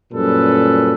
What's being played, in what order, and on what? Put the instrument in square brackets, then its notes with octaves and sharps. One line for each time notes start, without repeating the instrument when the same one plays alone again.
[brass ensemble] F#2 A#2 G3 C#4 A4 B4